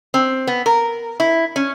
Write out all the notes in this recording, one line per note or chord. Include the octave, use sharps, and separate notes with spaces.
C4
B3
A#4
E4
C#4